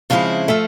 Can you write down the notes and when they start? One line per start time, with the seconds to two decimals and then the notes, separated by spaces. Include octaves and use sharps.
0.10 C#3 F3 G#3 C4 E4 F5
0.48 F3 A3 E5